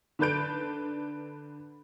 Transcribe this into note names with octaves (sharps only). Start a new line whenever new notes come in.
D3 D4 B4 G6 D7